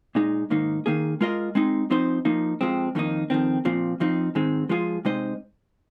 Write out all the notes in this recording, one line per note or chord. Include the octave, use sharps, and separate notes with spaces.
A#2 G#3 D#4
G#2 D#3 A#3 D#4
D#3 A#3 G#4
G#3 F4 A#4 D#5
G#3 C4 D#4
F3 C4 D#4 C5
F3 A#3 D#4
F2 F3 G#3 C4
F2 D#3 A#3 D#4
F2 D#3 C4
A#2 F3 C4
F2 F3 C4 D#4
G#2 D#3 G#3 C4
F3 G#3 F4 G#4
C3 G#3 D#4 C5 D#5